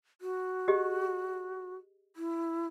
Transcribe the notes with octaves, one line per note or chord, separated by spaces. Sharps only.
F#4
G4 G#4 D#5
E4